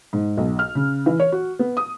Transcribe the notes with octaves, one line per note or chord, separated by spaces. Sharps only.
G#2
B1
F6
C#3
E3
C#5
F#4
B3
D#6